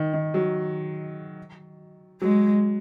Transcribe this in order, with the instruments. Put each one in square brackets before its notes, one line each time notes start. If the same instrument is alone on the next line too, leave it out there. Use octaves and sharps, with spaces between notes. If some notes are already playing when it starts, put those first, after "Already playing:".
Already playing: [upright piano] D#3
D#3
F#3
[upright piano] F#3 [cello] G#3